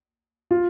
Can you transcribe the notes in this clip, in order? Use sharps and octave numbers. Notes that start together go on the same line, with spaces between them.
F4